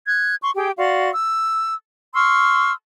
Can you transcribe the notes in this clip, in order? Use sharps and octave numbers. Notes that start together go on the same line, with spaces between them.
F#6 G#6
C6 C#6
G4 G#4 G5
F#4 D5 F5 C6
E6
C6 C#6 E6 F6